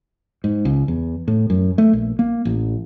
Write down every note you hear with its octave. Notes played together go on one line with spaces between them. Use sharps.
G#2
C#2
E2
A2
F#2
A3
A#1
A#3
A1